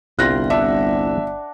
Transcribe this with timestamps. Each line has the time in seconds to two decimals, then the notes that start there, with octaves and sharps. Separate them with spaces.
0.19 G1 C2 F4 E5 G5 C6 F#6 A#6
0.50 D4 E5 F#5